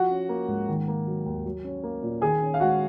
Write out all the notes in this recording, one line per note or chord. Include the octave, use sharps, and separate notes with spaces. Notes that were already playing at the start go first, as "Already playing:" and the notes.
Already playing: F3 F#4 F#5
C#4
A#3
G#2
D#3
A#3
F#3
D#2
F#3
C#4
A#3
A#2
D#3 G#4 G#5
C#4
F5
G#3 F#4 F#5